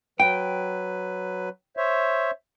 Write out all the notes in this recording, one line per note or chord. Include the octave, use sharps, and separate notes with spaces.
F#3 B4 G5
C5 C#5 E5